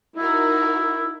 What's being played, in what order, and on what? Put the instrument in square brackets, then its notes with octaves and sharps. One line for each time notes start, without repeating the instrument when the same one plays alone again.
[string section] D#4 F#4 A#4 [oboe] E4